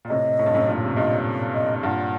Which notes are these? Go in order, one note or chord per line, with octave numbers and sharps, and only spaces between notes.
A#2
A2 C3 D#5
A2
G2
F#2 A2
G2 A#2
C3
G2 A#2 D#5
D#5
G2 A#2 F#5